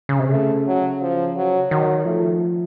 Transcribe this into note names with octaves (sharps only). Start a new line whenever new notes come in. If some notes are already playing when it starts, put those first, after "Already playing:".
C#3
C3
C#3 A3
F#3
F3
F#3
D#3 F#3
F3 A3